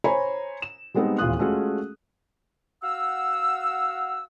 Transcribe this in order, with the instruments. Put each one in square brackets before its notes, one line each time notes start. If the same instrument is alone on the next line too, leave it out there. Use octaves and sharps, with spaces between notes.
[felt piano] C5 C#5 G#5 A#5 B5
E7
G3 G#3 B3 C4 D#4
D#1 E2 F4 D#6 F#6
G#3 A3 C#4 F4 F#4 G#4
[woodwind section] F#4 F5 F#5 E6